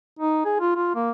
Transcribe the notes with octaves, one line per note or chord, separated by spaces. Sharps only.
D#4
G#4
F4
F4
A#3